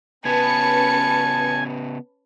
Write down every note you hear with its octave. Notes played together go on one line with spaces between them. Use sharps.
C#3 B3 C#4 B4 G#5 A5 C#7